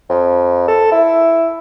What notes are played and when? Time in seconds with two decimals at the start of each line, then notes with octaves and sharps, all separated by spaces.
0.09 F2
0.68 A4
0.92 E4